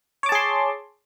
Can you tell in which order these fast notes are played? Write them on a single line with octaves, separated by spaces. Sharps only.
C#5 D6 A5 G#4 C6